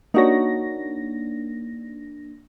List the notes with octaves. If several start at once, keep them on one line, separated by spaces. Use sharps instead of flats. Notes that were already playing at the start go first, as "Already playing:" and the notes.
A#3 D4 D#4 F#4 C#5 A#6